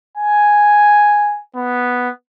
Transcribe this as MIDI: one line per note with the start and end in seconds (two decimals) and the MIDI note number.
0.17 1.40 80
1.56 2.09 59